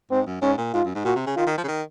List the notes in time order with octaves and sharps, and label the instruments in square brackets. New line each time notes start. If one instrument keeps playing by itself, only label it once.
[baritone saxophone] G#2 [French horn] C4
[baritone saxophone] F#2
[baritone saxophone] G#2 [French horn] C#4
[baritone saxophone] A#2
[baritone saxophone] G#2 [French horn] F4
[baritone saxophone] F#2
G#2
[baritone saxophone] A#2 [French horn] F#4
[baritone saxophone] C3
C#3
[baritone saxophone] D#3 [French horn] F4
[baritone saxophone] D#3
F3
C#3
D#3